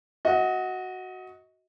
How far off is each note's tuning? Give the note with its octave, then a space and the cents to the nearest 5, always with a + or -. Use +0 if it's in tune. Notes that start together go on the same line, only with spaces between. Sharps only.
F#4 +0 D#5 +30